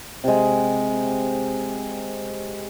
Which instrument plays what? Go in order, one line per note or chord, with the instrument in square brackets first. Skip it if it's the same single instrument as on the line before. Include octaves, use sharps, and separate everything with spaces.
[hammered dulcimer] C3 G#3